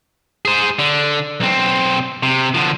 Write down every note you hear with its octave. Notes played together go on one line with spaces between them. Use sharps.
G#4 C5
D3
B1 C4
C3
D3 F3